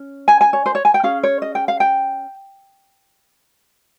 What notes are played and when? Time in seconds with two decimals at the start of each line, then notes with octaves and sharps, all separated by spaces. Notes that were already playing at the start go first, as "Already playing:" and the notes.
Already playing: C#4
0.28 G#5
0.41 G#5
0.53 C#5
0.66 C5
0.75 C#5
0.85 G#5
0.94 G5
1.03 C#4 G#4 F5
1.23 C#5
1.42 D#5
1.55 G5
1.68 F5
1.80 G5